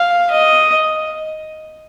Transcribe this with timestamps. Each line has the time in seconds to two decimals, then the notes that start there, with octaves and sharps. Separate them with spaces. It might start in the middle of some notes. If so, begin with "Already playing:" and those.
Already playing: F5
0.30 D#5